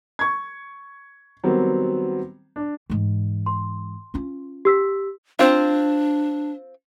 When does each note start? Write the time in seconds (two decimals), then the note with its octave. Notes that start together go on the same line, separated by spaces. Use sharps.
0.19 C#6 G#6
1.43 D#3 F#3 G3 B3 C4
2.56 D4
2.90 G#2 E3
3.46 C6
4.14 C#4 F4
4.65 G4 E6 B6
5.39 C4 D4 F4